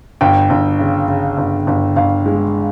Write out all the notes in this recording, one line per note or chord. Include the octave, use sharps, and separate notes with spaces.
G1 G5
G1
C#3
C#3
G1
G1
G1 F5
G#3